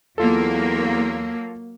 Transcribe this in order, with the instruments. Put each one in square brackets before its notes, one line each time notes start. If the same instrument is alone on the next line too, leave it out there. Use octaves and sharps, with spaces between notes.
[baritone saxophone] E2 [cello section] F#3 A#3 [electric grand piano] F4 A4